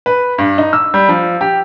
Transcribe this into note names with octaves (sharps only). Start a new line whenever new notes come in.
B4
G2
D#4
E6
G3
F3
G4